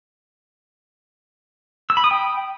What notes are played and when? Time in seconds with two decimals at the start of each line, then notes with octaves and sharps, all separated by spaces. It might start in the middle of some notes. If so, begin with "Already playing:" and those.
1.90 E6
1.97 B5
2.04 D#6
2.11 G5